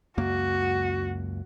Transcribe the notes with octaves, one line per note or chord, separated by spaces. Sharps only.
C#2 F#2 A#3 F#4